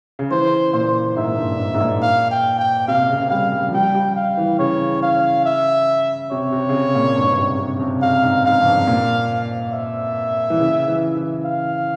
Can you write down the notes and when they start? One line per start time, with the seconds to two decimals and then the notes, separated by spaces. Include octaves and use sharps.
0.19 C#3
0.31 E3 C5
0.73 A#2 C5
1.17 G#2 E5
1.24 A#2
1.30 G#2
1.38 G2
1.59 G#2
1.74 G#2
1.80 A#2
2.02 F5
2.31 G5
2.59 G5
2.88 C3 F5
3.04 C3
3.10 C#3
3.30 G3 F5
3.52 G3
3.69 F3
3.74 G3 G5
3.95 G3
4.16 F5
4.38 E3
4.59 C#3 C#5
5.03 F5
5.46 E5
6.31 C3 C#5
6.52 C3
6.69 C#3
6.74 C3
6.95 A#2
7.16 G2
7.23 G#2
7.30 G2
7.39 C3
7.59 C3
7.76 C#3
7.80 C3
8.02 C3 F5
8.23 G#2
8.45 G#2 F5
8.61 F2
8.66 G2
8.87 A#2
9.73 E5
10.50 E3
10.60 C#3
10.88 E3
11.17 E3
11.45 F5